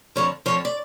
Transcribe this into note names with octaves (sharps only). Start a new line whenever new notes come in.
F2 D3 F3 C#5
F2 D3 F3 C#5
D5